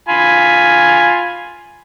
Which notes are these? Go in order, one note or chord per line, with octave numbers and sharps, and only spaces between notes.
F4 G#5 B5